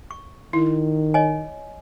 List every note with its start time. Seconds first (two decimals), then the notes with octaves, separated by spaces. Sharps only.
0.11 C#6
0.53 D#3 E4
1.14 C#5 D#5 G#5